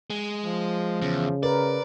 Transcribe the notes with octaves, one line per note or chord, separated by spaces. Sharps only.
G#3
F3
E2 C#3
A#4 B4 D5